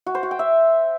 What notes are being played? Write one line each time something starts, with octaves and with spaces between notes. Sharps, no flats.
F#4
C5
F#4
G5
E5